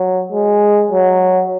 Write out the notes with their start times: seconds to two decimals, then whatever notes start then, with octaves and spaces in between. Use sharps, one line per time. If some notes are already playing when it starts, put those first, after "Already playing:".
Already playing: F#3
0.32 G#3
0.91 F#3